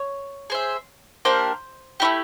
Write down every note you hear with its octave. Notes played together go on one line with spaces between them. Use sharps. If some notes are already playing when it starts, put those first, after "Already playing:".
Already playing: C#5
G#4 C5 E5
A#3 D4 G4 A#4 C5
A3 C#4 E4 G4